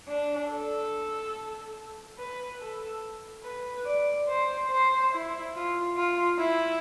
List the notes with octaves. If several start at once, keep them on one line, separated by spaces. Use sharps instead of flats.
D4
A4
B4
A4
B4
D5
C5
C5
E4
F4
F4
E4